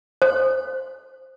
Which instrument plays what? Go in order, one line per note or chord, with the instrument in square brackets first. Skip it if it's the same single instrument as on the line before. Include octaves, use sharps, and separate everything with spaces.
[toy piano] C5